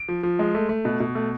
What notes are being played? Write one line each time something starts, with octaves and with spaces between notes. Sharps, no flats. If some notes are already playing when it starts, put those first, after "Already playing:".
Already playing: D7
F3
F3
G#3
A3
A3
B2
B2
A3